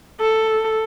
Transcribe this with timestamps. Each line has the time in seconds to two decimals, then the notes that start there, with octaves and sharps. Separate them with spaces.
0.20 A4